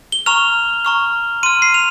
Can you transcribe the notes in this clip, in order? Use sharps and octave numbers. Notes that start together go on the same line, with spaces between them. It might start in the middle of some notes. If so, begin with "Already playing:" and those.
G7
A#5 C#6 F6 F7
A#5 C#6 F6
C6 F6 D#7
C7
F7